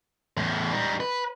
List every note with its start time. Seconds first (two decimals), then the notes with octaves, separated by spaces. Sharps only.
0.37 E2 A2
0.72 G3 D#4
1.00 B4